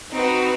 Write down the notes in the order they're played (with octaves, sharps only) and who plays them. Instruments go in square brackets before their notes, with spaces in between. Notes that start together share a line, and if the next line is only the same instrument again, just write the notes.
[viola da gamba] C4 [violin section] D#4 F#4 B4